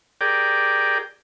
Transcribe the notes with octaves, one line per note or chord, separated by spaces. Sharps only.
G4 G#4 A#4 D5 G5